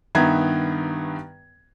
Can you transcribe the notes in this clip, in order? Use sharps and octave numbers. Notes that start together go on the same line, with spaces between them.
G2 D#3 B3 E5 A#5 G#6